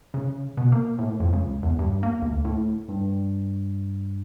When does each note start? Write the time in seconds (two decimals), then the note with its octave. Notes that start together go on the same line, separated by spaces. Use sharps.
0.14 C#3
0.57 B2
0.72 A#3
0.99 A2
1.20 F2
1.33 C#2
1.63 E2
1.79 G2
2.03 A#3
2.22 D2
2.45 A2
2.89 G2